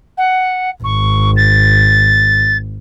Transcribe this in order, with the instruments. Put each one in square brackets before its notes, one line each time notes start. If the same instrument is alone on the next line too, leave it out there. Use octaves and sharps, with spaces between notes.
[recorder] F#5
[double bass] G#1 [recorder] C#6
[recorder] A6